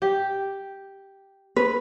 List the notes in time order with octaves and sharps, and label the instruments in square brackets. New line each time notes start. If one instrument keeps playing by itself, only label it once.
[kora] G4
[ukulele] B4